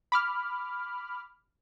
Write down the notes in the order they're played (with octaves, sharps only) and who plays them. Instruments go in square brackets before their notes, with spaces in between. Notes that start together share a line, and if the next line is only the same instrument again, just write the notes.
[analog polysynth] B5 D6 F6